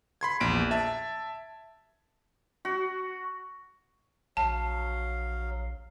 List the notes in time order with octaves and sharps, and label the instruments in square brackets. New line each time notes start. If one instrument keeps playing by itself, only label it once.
[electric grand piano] B5 C6 G#6
A#1 E2 D7
E5 A5
[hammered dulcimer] F#4
[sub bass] A#1 [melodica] F#3 F5 [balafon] A5